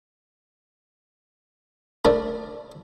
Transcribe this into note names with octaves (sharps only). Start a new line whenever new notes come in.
A3 D4 A#4 D5